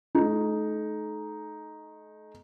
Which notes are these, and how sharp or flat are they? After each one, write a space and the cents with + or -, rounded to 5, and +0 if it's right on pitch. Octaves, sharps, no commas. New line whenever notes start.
A3 -40 D#4 +0